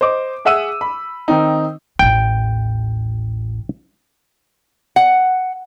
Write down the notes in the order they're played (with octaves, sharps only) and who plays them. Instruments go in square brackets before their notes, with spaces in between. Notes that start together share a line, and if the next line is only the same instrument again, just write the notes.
[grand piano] C5 D#5 D6
G#4 E5 F#5 E6 D#7
B5
D#3 C4 D#4
[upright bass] A1 D#2 [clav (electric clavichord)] G5
[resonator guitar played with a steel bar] F#5